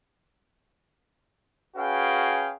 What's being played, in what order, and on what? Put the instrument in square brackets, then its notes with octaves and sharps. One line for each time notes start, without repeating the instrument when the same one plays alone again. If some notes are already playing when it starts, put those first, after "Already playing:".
[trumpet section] C#4 F#4 G#4 B4 F5 G5